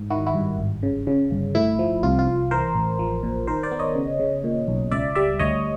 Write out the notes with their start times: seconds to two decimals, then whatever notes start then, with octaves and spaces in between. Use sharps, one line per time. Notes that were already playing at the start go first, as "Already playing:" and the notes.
Already playing: G#2
0.10 D#3 E4 F#4
0.26 E4 F#4
0.35 G2
0.58 G#1
0.83 C#3
1.07 C#3
1.31 G1
1.55 A2 E4
1.79 F3
2.03 C2 F4
2.19 F4
2.27 C2
2.51 E3 A#4 C5
2.75 A1
2.99 F3
3.23 A#2
3.47 D#3 A#4 C5
3.63 C5 D5
3.71 B3
3.79 C#5 D#5
3.96 C#3
4.20 C#3
4.44 A#2
4.68 B1
4.91 C#2 D5 E5
5.15 G3 D5 E5
5.39 D2 C#5 D#5